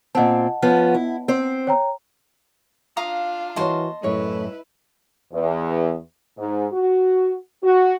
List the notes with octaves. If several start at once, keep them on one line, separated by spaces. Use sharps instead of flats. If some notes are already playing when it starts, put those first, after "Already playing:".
A#2 C4 D#5 F#5 A5
F3 B3 C#4
E4
C4 C5
C#5 G5 A#5
D4 F4 F5 A#5 D#6
E3 A#3 F#4 C#5 D#5 A5 C6
F#2 A2 A3 E4 B4 C#5
E2
G#2
F#4
F#4